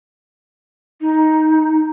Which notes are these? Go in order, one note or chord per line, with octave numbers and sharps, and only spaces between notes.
D#4